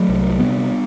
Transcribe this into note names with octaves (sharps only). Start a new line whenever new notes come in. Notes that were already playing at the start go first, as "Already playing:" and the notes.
Already playing: F#3 A3
C2
C3 G3 B3